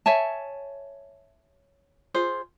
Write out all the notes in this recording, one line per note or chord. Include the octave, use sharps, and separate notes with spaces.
C#5 E5 G#5 A5
F4 G#4 C5